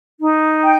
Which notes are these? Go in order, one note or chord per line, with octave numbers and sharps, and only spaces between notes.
D#4
G5